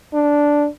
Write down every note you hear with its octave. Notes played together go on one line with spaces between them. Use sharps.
D4